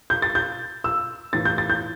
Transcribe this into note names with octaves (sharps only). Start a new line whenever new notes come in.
G6
A6
G6
E6
A2 E3 A6
G6
A6
G6